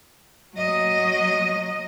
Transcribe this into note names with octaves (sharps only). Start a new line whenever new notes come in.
F#3 D#5